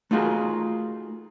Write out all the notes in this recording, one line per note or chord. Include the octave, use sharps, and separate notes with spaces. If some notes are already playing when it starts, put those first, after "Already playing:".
A3 D#4 F4 F#4 G#4 A#4